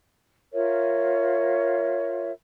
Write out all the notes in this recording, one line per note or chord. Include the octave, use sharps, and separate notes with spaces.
F4 A#4 C#5 E5